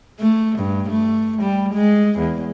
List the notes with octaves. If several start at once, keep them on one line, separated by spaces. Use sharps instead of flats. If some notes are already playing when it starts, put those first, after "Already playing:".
A3
G2
A3
G3
G#3
E2